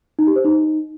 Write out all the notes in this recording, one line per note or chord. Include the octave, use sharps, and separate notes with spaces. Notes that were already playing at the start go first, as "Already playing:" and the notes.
D#4
G4
C5
D#4